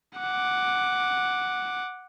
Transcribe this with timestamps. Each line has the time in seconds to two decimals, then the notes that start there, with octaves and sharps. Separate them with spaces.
0.19 F#5 D6